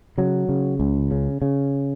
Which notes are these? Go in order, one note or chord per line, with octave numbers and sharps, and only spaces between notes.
C#3 F#3
C#3
C#2
C#3
C#3